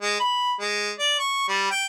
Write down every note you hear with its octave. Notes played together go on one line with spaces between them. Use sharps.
G#3
B5
G#3
D5
C#6
G3
G5